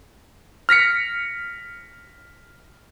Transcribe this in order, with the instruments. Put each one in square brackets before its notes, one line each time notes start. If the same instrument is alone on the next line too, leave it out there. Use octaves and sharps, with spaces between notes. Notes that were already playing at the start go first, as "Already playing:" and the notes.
[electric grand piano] F6 A#6 B6 C#7